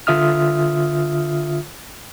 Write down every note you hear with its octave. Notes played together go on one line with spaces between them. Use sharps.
D3 F4 E5 D#6 F6